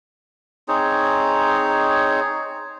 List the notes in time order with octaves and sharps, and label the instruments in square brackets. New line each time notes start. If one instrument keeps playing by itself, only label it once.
[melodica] C4 D#4 G#4 C#5